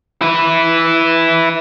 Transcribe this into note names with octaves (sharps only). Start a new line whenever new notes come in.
E4 B4